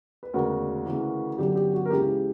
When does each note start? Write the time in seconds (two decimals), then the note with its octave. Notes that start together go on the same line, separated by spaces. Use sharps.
0.23 B4
0.33 E1 D2 C#3 F#4 A#4
0.86 D2 C#3 E3
1.38 G1 F#2 D3 F#3 G4
1.56 G4
1.74 F#4
1.85 A#4
1.90 C#2 C#3 E3 G4